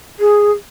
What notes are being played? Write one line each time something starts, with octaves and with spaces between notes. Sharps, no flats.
G#4